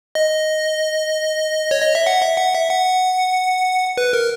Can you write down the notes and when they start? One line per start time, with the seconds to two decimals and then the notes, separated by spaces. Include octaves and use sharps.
0.15 D#5
1.71 C#5
1.82 D#5
1.95 E5
2.07 F#5
2.22 E5
2.38 F#5
2.54 E5
2.70 F#5
3.97 B4
4.13 A#4